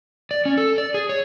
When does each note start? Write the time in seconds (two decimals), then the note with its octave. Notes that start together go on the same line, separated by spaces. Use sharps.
0.31 D5
0.45 C#4
0.57 A4
0.78 D5
0.94 G#4
1.09 C#5